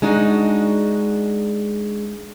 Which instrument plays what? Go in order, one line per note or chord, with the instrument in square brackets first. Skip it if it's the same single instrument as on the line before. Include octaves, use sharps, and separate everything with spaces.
[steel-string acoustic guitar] G#3 D4 D#4 F#4